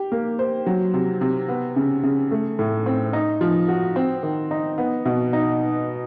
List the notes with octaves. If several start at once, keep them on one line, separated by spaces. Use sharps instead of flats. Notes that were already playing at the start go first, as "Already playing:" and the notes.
Already playing: G4
A#3
C5
F#3
C3
C3
B3
C#3
C#3
A3
A2
C4
D#4
F3
F#4
C4
D#3
D#4
B3
B2
D#4